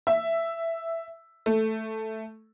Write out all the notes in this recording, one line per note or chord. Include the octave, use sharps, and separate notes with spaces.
E5
A3